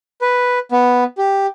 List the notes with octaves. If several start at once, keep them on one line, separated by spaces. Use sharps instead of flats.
B4
B3
G4